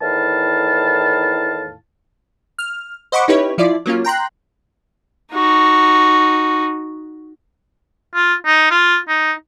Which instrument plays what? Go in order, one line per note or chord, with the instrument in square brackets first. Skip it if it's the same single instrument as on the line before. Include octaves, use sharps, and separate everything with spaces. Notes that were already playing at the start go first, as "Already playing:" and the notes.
[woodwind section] E2 A2 D#3 E4 F5 A5
[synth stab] F6
C5 D#5 F#5 B5 C#6 D6
C#4 D#4 E4 G4 B4 C#5
F3 E4 F4 D5
F#3 A#3 C#4 F4
G5 A#5 C6 F#6
[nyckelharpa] D#4 F#4
[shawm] F4
D#4
F4
D#4